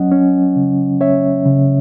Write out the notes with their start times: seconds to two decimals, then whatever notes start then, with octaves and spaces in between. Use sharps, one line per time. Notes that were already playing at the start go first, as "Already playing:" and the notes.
Already playing: F#3 C#4 D#5 F#5
0.12 C#4
0.56 C#3
1.01 C#4 C#5 E5
1.46 C#3